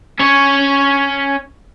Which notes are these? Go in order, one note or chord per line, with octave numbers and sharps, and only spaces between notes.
C#4 C#5